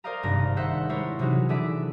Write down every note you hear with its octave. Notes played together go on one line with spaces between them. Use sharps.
A#4 C5 D5 D#5 F5 A#5
G#1 G2 C3 G#3 A#6
D#3 G#4 C5 E5 F#5
G3 G#3 E4 A#4 C5 C#5
C3 E3 F#3 D#4 F#4 G#4
D3 E3 G#4 E5 D6 B6